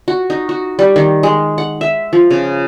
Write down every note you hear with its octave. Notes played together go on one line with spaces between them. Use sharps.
F#4
D#4
F#4
G3
D#3
G#3
F#5
E5
F3
C#3